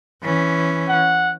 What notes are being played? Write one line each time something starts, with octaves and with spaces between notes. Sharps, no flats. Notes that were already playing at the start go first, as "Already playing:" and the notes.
E3 C#4
F#5